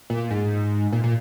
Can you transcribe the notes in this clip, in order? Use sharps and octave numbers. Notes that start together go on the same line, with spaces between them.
A#2
G#2
A#2
A#2